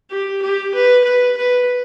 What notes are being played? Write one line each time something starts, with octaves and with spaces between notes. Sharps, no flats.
G4
G4
B4
B4
B4